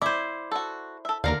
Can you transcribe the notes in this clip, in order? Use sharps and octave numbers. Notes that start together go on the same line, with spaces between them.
E4 C5 D5 D6
F#4 A4
A4 E5
D#2 D3 A#4 D5 F5 A#5